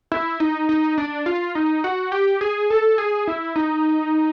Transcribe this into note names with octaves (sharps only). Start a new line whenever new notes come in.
E4
D#4
D#4
D4
F4
D#4
F#4
G4
G#4
A4
G#4
E4
D#4